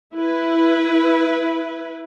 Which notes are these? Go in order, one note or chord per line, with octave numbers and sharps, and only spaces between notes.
E4 B4